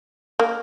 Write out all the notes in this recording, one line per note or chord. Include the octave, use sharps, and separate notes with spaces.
A#3